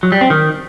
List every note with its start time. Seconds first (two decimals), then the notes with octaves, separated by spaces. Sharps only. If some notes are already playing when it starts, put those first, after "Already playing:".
0.03 F#3
0.12 G3
0.21 C4
0.30 D#3